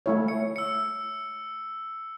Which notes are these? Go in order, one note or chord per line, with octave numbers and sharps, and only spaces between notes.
A3 E4 C#5
C#7
E6 C#7